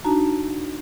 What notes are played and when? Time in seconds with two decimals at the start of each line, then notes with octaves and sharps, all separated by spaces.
0.05 D4 D#4 F#4 A5 A#5